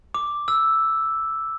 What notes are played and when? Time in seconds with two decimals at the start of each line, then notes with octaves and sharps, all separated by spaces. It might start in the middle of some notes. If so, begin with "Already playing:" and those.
0.14 D6
0.48 E6